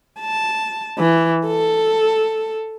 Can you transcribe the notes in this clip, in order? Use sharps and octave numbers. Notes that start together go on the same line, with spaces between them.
A5
E3
A4